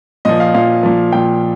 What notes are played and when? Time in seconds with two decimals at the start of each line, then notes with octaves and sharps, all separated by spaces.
0.25 A#2 F3 D#5
0.40 F5
0.54 A#2 F3 F5
0.83 A#2 F3
1.12 A#2 F3 G5